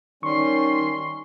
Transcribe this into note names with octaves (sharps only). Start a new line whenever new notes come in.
D#3 G3 C#4 C6 C#6